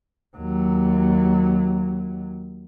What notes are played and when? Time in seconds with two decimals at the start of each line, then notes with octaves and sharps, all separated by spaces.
0.36 D#2 F#3